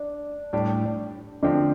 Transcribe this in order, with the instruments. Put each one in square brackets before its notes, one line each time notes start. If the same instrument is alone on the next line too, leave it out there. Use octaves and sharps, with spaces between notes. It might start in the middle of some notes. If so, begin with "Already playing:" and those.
Already playing: [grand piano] D4
[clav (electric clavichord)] A2 G3 D4 G4
[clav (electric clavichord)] D3 F3 C4 G4 [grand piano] D4